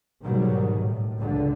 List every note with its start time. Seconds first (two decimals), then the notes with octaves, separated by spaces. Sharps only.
0.23 D#2 G#2 B2 D#3 F#3 G3
0.80 A2
1.16 C#2 D3